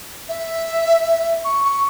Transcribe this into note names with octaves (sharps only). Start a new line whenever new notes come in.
E5
C#6
C#6